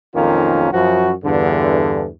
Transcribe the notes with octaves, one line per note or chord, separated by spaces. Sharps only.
B1 F2 D#3 A#3 C#4 F4
F#2 F3 F#4
E2 G2 D3